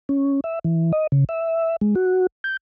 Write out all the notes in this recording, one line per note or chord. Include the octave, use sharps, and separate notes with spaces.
C#4
E5
E3
D#5
C#3
E5
G#3
F#4
G6